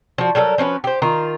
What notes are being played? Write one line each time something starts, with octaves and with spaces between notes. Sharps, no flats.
F3 F#4
F#3 G3 A4 A#4
F3 C#4 F#4 B4
G4 C5
D#3 F4 A#5